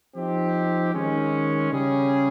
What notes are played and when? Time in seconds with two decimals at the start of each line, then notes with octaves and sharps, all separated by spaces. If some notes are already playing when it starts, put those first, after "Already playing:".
0.15 F3 C4 D#4 G4
0.94 D#3 G#3 C#4
1.71 C#3 G3 C#4 G#4